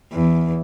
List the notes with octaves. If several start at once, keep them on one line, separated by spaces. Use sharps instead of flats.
E2